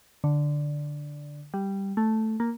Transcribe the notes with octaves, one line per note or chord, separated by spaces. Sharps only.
D3
G3
A3
A#3